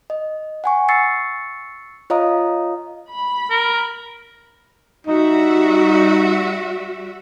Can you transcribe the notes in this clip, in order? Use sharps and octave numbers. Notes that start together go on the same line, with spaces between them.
D#5
F#5 G#5 C#6
C#6 E6 A6 C7 C#7
F4 C#5 D#5 F5 A#5 D#6
B5
A#4
G3 D#4 F#4 E5